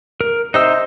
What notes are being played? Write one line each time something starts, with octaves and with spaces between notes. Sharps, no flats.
A#4
C3 D#4 C5 D#5 E6